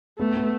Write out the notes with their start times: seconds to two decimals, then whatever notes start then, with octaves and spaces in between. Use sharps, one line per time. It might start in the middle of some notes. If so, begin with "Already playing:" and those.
0.19 A3 B3
0.37 B3